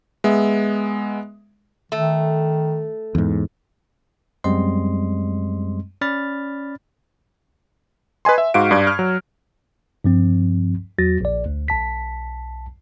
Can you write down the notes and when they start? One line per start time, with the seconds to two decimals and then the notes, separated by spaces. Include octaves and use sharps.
0.24 G#3 B3 E5
1.92 D#3 A3
3.15 E2 G#2
4.44 F#2 G3 G#3 C4 D#5 C6
6.01 C#4 D5 B5 F6 A6
8.25 B4 D#5 G#5 C6
8.38 E5
8.54 G#2 F#4 F5 D7
8.71 G2 D5 G#6
8.87 F6
8.99 F#3
10.04 G2 F3 C4
10.99 E2 F#3 F#4 A6 A#6
11.21 A#1 D5
11.46 D2
11.68 B1 A5 B6